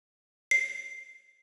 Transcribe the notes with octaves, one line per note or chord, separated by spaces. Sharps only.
C7